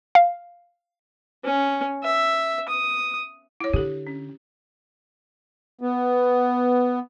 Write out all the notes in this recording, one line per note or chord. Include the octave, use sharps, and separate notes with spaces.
F5
C#4
E5
D#6
E4 C#5
D3 G4 A4
C#4
B3